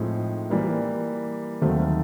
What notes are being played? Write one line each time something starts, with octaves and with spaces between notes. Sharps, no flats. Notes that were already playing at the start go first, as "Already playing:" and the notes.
Already playing: A2 F3 G#3 C4 D#4
E3 G3 A#3
D#2 D#3 F#3 A3 C4